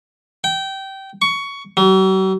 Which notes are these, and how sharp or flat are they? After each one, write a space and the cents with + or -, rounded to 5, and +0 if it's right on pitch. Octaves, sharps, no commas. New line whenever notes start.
G5 -20
C#6 +15
F#3 +45